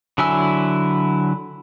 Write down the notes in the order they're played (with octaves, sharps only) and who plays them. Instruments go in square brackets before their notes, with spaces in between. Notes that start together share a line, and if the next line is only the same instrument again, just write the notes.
[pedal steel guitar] D3 F#3 E4 G#5 E6